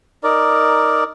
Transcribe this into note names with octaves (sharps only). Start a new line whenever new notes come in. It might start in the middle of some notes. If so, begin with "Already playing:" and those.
D#4 A#4 D5